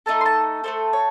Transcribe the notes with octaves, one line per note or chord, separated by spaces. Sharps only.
A3 D#4 A4 A5
C6
A5
A3 D#4 A4 C5
C#5